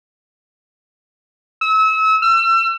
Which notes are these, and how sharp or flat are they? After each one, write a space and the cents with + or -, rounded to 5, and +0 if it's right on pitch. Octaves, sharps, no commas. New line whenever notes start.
E6 -35
E6 +35